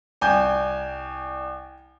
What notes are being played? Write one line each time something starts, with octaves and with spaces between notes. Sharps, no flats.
C2 G5 G#5 G6